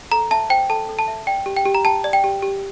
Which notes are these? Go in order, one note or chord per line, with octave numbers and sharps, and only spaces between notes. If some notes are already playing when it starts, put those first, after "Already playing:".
A4 A#5
E5 A5
C5 G5
A4 A5
A4
A5
E5
D5 G5
G4
G5
G4
A#5
G5 A5
D5
G5
G4
G4